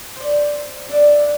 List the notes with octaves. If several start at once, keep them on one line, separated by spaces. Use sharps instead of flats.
C5 D5
D4 D5 E5